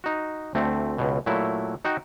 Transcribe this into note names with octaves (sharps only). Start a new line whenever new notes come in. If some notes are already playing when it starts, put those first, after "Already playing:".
D#4 F#4
D2 A3 C4
C#2 B2
A#2 F#3 A3 E4
D#4 F#4 G5